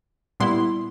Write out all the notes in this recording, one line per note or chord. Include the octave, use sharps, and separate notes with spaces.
A#2 G3 B3 E4 C6